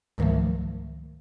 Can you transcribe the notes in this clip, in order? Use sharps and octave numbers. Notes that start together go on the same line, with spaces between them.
C#2 G#2 D#3 F3 F#3 A3